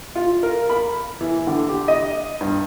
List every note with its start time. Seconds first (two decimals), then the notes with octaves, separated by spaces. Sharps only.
0.15 F4
0.43 A#4
0.70 B5
1.21 E3
1.47 D3
1.69 G4
1.88 D#5
2.41 G2